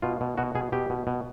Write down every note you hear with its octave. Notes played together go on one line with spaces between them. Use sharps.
B2 F4
B2
B2 F#4
B2 G#4
B2 G4
B2
B2